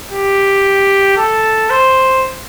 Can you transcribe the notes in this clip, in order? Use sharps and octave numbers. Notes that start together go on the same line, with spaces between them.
G4
A4
C5